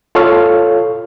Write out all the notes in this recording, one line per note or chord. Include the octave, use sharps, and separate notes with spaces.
F4 A4 C#5 F5